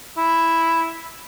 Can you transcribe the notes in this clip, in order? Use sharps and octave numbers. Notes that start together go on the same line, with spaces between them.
E4